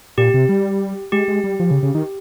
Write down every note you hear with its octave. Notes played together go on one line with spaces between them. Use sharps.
A#2 G4
C3
G3
G#3 G4
G#3
G3
F3
C#3
C#3
D#3